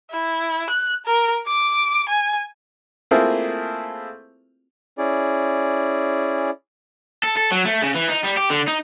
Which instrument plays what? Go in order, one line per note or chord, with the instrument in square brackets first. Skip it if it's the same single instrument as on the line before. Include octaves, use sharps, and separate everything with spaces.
[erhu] E4
F#6
A#4
D6
G#5
[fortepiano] A3 A#3 C4 E4 F4 G#4
[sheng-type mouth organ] C#4 E4 G#4 D5
[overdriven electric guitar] A4
A4
F#3
A3
C#3
E3
D#4
G3
G4
D3
D#4